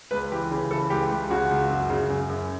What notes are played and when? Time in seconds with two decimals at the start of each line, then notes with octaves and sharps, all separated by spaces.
0.11 C#2 B4
0.32 E3 G4
0.51 C#3
0.71 E3 A4
0.90 C#2 G4
1.11 C#2
1.30 C#3 F#4
1.50 C#2
1.70 F#2
1.90 C#3
2.10 F#2
2.29 F#2